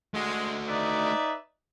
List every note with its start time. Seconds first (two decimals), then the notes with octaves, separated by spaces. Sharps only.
0.14 G#3 A3 F#4
0.66 D#4 B4 D5 E5